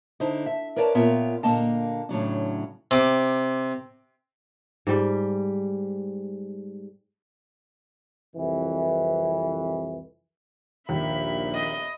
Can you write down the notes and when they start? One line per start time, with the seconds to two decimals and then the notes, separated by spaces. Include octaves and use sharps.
0.20 D3 D#4 E4 C5
0.46 E5
0.76 A#4 B4 C#5 D5 E5 A5
0.95 A#2 B3 F4 A#4 C#5 E5
1.43 A#2 D3 F#3 A#3 D#5 A5
2.09 A2 C#3 F#3 D4
2.91 C3 D6
4.87 G#2 G3
8.36 C2 F2 E3
10.89 A#1 D#2 E5 B5
11.55 D#5